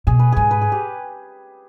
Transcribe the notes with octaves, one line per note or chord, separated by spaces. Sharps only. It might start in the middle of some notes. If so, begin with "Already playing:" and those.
B2 G#4
B4
G#2 G#4
B4
G#4
G4